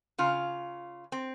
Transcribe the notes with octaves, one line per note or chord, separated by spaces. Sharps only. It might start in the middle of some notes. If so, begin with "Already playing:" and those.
C#3 F4
C4